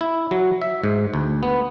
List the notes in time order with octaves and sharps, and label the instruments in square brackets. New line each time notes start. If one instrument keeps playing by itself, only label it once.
[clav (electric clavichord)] E4
F#3
E5
G#2
D2
B3